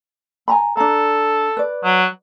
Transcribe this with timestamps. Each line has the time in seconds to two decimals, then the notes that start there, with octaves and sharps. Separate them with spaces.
0.48 G#5 A#5 B5
0.77 D4 A4 A#5
1.57 B4 D5
1.84 F#3